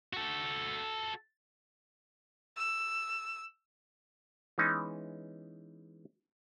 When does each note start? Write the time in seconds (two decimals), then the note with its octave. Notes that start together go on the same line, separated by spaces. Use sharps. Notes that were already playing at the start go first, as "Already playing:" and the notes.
0.13 F#4 A4
2.57 E6
4.58 E3 G#3 B3 C#4 D#4